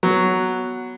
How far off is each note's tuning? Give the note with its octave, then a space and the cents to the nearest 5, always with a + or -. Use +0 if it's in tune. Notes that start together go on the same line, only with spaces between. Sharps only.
F#3 +0 B3 -10